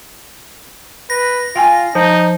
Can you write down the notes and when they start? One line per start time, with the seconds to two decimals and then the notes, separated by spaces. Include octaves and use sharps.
1.10 B4 A#6
1.56 F4 F5 G5 G#5
1.95 F3 D#4